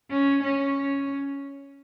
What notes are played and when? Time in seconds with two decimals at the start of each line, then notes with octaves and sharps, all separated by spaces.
0.10 C#4
0.43 C#4